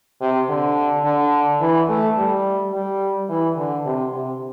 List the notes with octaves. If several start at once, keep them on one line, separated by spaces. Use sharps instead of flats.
C3
D3
D3
E3
A3
G3
G3
E3
D3
C3
C3